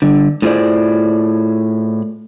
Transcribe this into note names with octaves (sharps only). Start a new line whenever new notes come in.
G2 D3
A2 F4 G#4 C5 D5